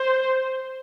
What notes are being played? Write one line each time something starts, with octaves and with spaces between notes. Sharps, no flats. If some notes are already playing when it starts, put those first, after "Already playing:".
Already playing: C5